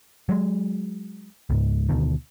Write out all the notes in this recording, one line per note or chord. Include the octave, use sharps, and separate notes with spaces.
F#3 G#3
C#2 G#2
D2 B2 D#3